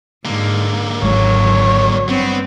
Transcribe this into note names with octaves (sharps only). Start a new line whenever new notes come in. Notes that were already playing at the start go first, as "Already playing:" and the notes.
G#2 D3 A#3
G#1 F#3 G#3 C#5
G2 B3 C4